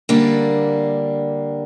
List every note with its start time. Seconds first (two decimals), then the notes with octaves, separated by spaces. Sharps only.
0.09 D3 G3 A#3 D4